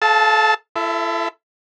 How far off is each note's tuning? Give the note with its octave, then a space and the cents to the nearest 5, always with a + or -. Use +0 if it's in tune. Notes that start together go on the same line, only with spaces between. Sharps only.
A4 -35 F5 +0 A5 +0
E4 +40 A4 +0 E5 +0